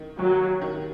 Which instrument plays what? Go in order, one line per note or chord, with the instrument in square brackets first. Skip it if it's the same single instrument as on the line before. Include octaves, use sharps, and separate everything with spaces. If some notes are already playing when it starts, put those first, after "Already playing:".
Already playing: [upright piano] D#3
[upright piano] D#2 [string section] F#3
[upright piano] D#3